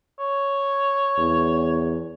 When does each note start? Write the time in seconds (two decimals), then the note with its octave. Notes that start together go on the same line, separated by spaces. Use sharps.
0.19 C#5
1.18 E2